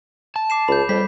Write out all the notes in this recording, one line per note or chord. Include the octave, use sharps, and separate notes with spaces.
A5
D6 C7 E7
C#2 B5 G6
F2 G3 B6